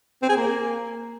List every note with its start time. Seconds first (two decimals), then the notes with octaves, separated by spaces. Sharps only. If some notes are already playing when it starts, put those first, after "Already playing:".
0.22 C4
0.29 G#4
0.36 A#3